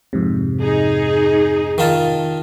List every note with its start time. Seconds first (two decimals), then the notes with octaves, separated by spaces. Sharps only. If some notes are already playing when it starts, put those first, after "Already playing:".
0.13 F2 G#2 C3
0.62 D#4 G#4
1.78 D#3 F4 A5